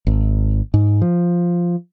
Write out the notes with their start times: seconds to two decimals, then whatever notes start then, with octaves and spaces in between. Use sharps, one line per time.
0.07 G#1
0.74 G#2
1.02 F3